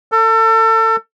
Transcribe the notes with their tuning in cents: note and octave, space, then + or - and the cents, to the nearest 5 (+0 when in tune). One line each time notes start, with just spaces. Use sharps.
A4 +30